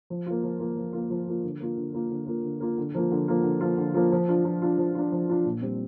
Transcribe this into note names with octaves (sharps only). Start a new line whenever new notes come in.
F3
A#3 F4
F3
A#3 F4
F3
A#3 F4
F3
A#3 F4
D3
A#3 F4
D3
A#3 F4
D3
A#3 F4
D3
A#3 F4
D3
F3 A#3 F4
D3
F3 A#3 F4
D3
F3 A#3 F4
D3
F3 A#3 F4
F3
D4 F4
F3
D4 F4
F3
D4 F4
F3
D4 F4
A#2
G3 C4